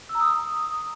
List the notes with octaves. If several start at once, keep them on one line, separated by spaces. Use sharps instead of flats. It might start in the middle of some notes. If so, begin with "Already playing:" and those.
E6
A#5
D#6